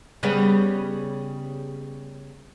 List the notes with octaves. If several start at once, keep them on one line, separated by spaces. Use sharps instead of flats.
C#3 G3 B3